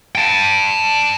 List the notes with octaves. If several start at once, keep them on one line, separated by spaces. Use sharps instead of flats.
G5 A5